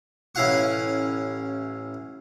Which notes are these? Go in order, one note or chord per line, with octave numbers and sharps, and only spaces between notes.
A1 C#4 E4 F5 F#5 C#6